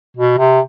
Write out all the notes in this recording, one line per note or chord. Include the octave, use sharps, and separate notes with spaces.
B2
C3